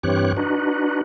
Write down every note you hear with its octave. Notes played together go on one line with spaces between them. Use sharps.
G2 E3 C4 G4 C#5 F#6
D4 D#4 F#4 B4